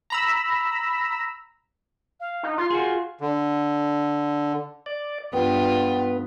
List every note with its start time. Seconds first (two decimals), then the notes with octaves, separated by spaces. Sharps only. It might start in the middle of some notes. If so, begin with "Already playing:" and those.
0.10 A#5 B5 E6
2.20 F5
2.43 D#4
2.58 F4 C6
2.70 F#4 G#4 C6
3.21 D3
4.86 D5
5.33 G2 B3 F4 G5